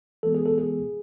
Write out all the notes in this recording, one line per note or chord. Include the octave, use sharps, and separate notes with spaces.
E3 G#3 B3 A4
G#4
A4
G#4